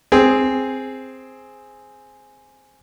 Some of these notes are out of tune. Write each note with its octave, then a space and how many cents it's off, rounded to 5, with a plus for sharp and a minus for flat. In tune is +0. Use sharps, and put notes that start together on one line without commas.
C4 +0 G#4 +0